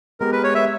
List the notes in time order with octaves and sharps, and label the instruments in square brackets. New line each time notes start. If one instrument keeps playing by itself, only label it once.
[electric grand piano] G#3 B3 G4 [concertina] A#4
[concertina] B4
C#5
E5